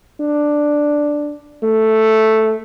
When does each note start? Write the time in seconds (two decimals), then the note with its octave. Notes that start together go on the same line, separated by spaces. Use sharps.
0.21 D4
1.63 A3